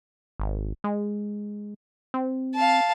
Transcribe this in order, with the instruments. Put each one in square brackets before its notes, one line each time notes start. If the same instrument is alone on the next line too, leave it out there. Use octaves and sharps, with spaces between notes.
[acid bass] G#1
G#3
C4
[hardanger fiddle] F5 A5